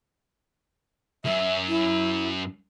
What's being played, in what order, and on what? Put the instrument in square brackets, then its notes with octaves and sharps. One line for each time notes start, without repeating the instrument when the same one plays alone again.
[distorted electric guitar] C#2 F#2 [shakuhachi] E5
[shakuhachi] E4